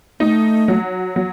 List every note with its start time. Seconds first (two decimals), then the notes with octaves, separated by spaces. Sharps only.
0.20 A3 D#4
0.68 F#3
1.16 F#3